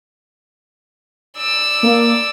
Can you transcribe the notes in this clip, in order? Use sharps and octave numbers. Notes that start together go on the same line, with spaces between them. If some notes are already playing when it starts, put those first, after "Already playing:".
D5 E6
A#3